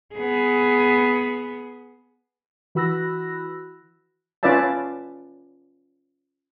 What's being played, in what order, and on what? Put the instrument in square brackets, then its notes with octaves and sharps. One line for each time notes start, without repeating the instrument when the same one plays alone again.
[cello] B3 G#4
[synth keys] E3 F#4 B5 E6 F#6 A#6
[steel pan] C#4 F4 B4 D5 E5 A5